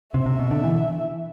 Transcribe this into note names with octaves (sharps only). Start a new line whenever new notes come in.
C3 E5
C3
B2
D3
E3